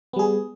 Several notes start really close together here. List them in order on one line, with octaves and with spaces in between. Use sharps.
B3 G3 G#4